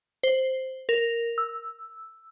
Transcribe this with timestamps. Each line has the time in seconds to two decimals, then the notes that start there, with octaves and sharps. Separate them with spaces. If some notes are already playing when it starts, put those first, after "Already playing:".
0.23 C5
0.89 A#4
1.38 E6